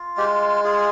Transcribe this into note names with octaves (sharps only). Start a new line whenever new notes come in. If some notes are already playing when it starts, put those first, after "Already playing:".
Already playing: F4
G#3 G4
F4 G#4